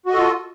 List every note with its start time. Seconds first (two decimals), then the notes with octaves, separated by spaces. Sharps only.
0.06 F#4
0.10 D#5
0.14 A4
0.17 F4